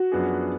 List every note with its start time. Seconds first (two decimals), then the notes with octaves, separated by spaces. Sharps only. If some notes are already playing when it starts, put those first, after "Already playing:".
Already playing: F#4
0.12 F#2 F3 B3 D4 G#4